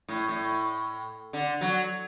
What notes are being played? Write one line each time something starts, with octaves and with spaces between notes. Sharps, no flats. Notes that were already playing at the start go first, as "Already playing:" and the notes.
A2
A2
D3
F#3